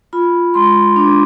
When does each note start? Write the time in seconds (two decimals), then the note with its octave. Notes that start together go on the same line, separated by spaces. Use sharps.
0.13 F4 B5
0.54 G#3 C6
0.96 D4 D6